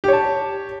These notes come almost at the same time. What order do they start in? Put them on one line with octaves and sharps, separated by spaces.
G4 C#5 A5